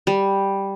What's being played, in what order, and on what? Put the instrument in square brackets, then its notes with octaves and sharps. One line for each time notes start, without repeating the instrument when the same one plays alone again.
[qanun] G3